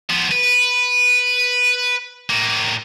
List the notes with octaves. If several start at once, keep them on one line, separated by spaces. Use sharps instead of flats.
F3 B3
B4
A2 A#3